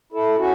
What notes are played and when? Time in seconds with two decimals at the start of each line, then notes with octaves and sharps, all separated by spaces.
0.12 E4 A4
0.38 C#4 F#4